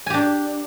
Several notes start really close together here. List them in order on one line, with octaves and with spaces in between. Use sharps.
G#5 G4 D4